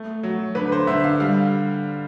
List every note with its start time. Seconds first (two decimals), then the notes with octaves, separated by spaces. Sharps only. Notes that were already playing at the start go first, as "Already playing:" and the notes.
Already playing: A3
0.23 F#3
0.55 D3 B4
0.72 C5
0.87 D3 E5
1.04 F5
1.20 G3 F5